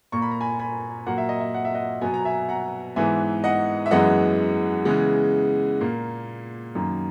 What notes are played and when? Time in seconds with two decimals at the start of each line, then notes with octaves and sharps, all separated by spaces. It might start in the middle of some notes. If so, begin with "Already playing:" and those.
0.12 A#2 A#3 C#6
0.22 B5
0.31 A#5
0.41 G#5 B5
0.59 G#5 B5
1.07 A#2 F#3 A#3 F#5
1.18 E5
1.29 D#5
1.40 E5
1.54 F#5
1.65 E5
1.75 D#5 F#5
2.02 B2 F#3 B3 G#5
2.14 A#5
2.25 E5 G#5
2.49 F#5 A#5
2.96 G#2 E3 B3 E5 G#5
3.44 D#5 F#5
3.86 E5
3.91 F#2 E3 G#3 B3 D#5 F#5
4.85 C#3 E3 G#3 B3
5.81 A#2 A#3
6.75 F#2 D#3 A#3